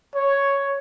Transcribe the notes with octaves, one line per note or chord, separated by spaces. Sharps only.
C#5